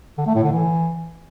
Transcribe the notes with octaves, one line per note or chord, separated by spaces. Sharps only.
D3
A3
A2
D3
E3